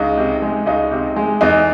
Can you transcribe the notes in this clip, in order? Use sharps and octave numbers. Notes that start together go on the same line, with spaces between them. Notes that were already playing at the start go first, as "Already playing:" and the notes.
Already playing: C#2 D#4
C3
G#3
C#2 D#4
C3
G#3
E2 D#4